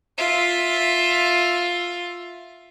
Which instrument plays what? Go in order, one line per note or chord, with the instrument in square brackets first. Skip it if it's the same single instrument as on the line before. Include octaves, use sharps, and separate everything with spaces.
[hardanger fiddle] F4 E5